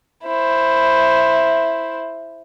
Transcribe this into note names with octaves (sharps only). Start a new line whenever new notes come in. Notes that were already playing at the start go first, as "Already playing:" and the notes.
E4 C5